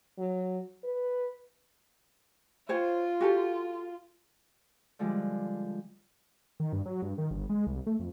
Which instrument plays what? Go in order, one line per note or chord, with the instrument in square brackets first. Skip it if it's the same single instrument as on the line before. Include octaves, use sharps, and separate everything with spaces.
[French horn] F#3
B4
[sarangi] F4 [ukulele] C5 C#5 G5
[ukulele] F#4 G4 A4
[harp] D3 F3 G3 G#3
[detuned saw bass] D#3
G2
F#3
G2
D#3
G1
G#3
C2
A3
F2